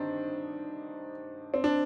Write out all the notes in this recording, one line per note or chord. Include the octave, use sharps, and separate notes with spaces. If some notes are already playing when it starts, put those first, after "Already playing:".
Already playing: G2 D3 D#3 C4 D4 D#4
C4
D4